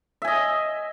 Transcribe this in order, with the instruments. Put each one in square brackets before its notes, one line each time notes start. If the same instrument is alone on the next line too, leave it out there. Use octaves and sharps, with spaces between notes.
[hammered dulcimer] E5
G#5
D#5